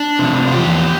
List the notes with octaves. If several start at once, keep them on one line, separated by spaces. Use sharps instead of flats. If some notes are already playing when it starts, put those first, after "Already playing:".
Already playing: D4
C3 F3
F4
E2 G4